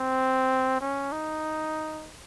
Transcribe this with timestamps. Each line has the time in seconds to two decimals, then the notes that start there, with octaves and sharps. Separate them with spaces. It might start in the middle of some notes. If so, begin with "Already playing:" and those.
Already playing: C4
0.81 C#4
1.12 D#4